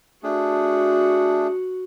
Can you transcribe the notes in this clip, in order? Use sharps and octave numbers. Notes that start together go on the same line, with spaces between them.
A3 D4 F#4 G#4